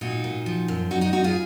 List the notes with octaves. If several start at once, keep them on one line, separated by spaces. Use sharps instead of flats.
A#2 D#4 F#4
A#2
F3
F#2
F#2 D#4 F#4
D#4 F#4
F#2 D#4 F#4
F4 G#4